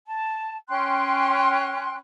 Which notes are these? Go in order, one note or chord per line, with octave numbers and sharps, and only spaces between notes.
A5
C#4 G5 C6 F#6